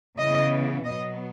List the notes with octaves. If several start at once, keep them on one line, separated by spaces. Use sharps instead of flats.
C#3 E3 B3 D#5
B2 F#3 B3 D#5